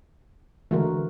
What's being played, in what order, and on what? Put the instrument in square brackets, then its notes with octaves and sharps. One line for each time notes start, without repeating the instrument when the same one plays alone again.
[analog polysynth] D3 G#3 A3 [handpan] E3 F#4 A#4